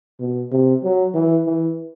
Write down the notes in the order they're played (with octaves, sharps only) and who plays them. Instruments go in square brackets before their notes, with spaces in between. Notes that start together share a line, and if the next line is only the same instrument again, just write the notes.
[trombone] B2
C3
F#3
E3
E3